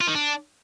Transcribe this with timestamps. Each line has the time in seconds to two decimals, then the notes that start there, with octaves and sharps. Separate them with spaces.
0.01 F4
0.08 D#3
0.15 D4